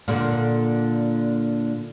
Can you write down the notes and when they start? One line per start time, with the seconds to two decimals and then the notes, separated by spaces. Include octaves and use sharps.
0.08 A#2 D3